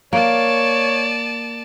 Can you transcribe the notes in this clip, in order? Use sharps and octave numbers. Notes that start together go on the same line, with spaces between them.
A#3 C#5 D5 A5